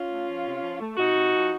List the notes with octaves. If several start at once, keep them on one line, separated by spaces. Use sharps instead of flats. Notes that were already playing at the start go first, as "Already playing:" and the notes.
Already playing: C#4 F4
A3
F3
C3
F3
A3
C3 D#4 F#4
C3
F3